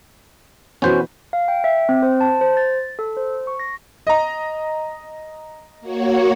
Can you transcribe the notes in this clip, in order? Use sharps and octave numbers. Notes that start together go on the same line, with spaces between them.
B2 E3 B3 C#4 F#4 B4 C5
F5
G5
E5
C4
C5
A5
C5
A6
A4
C5
C#6
A#6
D#5 A#5
A#3 F#4 C#5